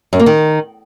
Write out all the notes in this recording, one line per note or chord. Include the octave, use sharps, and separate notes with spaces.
F#2
A#3
D#3